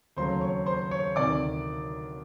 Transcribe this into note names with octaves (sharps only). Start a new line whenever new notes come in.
D#2 C#3 F#3 A3 C5 C6
C#5 C#6
C5 C6
C#5 C#6
D2 C3 D#3 D5 D6